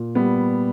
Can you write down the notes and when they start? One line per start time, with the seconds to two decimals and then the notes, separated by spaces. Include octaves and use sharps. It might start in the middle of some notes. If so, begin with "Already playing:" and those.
Already playing: A#2
0.15 G3 B3